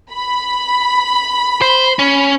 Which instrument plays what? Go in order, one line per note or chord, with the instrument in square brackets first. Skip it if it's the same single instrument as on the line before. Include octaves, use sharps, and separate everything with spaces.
[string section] B5
[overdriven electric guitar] C5
C#4